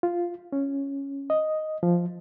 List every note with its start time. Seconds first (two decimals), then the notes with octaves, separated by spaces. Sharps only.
0.03 F4
0.53 C#4
1.30 D#5
1.83 F3